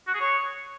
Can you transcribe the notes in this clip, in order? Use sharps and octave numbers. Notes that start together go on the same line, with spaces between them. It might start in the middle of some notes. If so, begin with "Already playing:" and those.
F#4
G#4
C#5